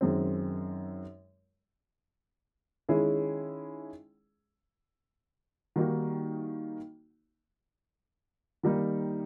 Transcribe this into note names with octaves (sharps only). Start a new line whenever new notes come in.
F#2 D#3 G#3 C4
D#3 G#3 C#4 E4 G#4
D#3 G3 A#3 D#4 F#4
D#3 G3 A#3 D#4